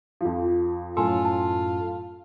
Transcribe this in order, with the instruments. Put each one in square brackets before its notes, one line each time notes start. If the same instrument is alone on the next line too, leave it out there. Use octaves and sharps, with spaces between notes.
[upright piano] F2 F3
[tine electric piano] F#2 A2 A4 [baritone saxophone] F4 [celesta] G#5 [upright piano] C6
[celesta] A5